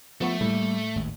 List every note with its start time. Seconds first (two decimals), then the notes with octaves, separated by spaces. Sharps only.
0.21 F3 A3 B3 C#6
0.41 A2 G3 A#3
0.96 G#1 D#2